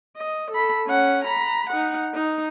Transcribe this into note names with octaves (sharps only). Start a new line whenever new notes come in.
D#5
A4 B5
C#4 F#5
A#5 B5
D#4 F#5
D#4